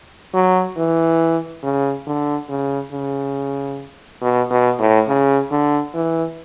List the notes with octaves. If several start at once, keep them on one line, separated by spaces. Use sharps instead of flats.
F#3
E3
C#3
D3
C#3
C#3
B2
B2
A2
C#3
D3
E3